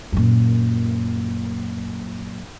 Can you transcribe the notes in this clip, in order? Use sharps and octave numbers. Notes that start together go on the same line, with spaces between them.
F#2 A#2